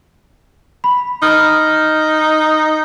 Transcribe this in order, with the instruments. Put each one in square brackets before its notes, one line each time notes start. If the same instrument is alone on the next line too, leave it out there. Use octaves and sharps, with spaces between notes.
[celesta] B5
[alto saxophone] D#4 [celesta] F6